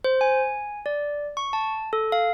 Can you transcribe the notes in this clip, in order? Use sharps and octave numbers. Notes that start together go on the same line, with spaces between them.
C5
G#5
D5
C#6
A5
A4
F5